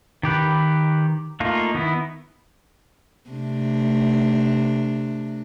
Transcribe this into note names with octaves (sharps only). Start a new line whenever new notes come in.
D#3 G4 B4
A3 A#3 D#4 F4
D#3 B3 E4
C3 A3 D4